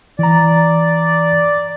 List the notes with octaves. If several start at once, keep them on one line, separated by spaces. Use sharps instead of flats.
E3 D5 A#5